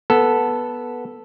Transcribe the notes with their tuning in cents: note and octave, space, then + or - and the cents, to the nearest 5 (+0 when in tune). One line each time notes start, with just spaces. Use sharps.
B3 -10 A4 +0